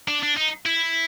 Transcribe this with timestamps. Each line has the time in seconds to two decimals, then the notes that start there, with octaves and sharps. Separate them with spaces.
0.08 D4
0.23 D4
0.37 D#4
0.66 E4